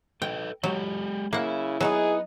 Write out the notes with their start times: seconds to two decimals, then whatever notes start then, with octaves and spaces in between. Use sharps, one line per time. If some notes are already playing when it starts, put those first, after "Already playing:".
0.22 A4 B4 D#5 G5
0.63 F#3 G#3 G4 D#5
1.33 C#3 A#3 E4 E5 F#5
1.80 F#3 B3 D#4 G#4 B4